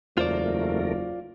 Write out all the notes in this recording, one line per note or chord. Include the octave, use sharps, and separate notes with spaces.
F#1 E2 A3 F4 A#4 C5 D5